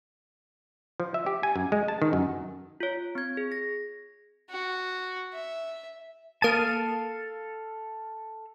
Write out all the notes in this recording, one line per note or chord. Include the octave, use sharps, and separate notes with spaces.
F3
E5
G4
G#5
F#2
G#3
A5
D#3
F#2
F4 C#5
C4 G#6
G#4
A#6
F#4
E5
A#3 A4 F5 A5 D#6 D#7